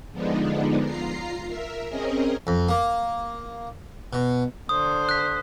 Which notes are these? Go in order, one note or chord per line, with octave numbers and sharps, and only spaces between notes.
D3 F3 G#3 B3 D4 D#4
F4 A#5 C7
A#4 E5
C4 C#4 G#4 A#4 D#5
F2
A#3
B2
D3 C5 D#6
F#6 B6